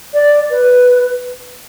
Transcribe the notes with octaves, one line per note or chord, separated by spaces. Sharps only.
D5
B4